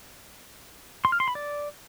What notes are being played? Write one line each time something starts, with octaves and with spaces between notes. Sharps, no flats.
C6
F6
C6
B5
D5